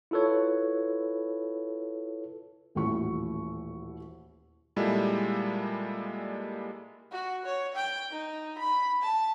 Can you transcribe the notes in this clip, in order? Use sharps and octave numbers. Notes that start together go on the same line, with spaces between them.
E4 F4 A4 B4 C#5
D#1 A1 E4 F#4 C#6
A#2 G3 G#3 E4 A4
F#4
C#5
G5
D#4
B5
A5